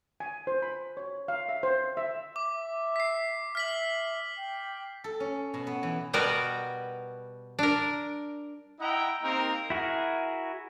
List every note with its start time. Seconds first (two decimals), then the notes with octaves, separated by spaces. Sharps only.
0.20 G#5
0.47 C5
0.62 B5
0.97 C#5
1.28 F5
1.49 E5
1.63 C5
1.97 E5
2.36 E5 D6
2.96 B6 C7
3.55 E5 F6 B6 F#7
4.38 G5
5.04 A4
5.20 C#4
5.54 B2
5.67 B3
5.83 E3
6.13 B2 G3 B3 F#4 A#4 B4
7.59 D4 A#4
8.80 E4 D#5 E5 F#5 G5 A#5
9.23 A#3 C4 D#4 G4 A#4 C5
9.70 E4 F#4 G#4 A#4